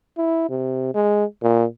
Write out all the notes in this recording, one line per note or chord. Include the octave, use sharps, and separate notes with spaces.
E4
C3
G#3
A#2